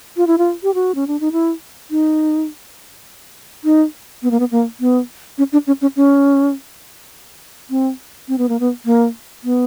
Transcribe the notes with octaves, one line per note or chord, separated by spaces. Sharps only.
F4
E4
F4
G4
F#4
C#4
D4
D#4
E4
D#4
D#4
B3
A#3
B3
A#3
B3
C#4
D4
C#4
C#4
C#4
C4
C4
B3
A#3
B3
A#3
B3